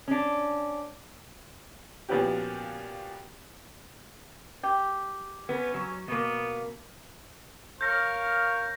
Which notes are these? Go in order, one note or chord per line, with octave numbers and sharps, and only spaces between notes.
C#4 D4
A#2 F3 B3 C#4 F#4 G4
G4
B3 C#4 B4
F#3
B2 A#3 B3
A#4 C#5 F5 G6 A#6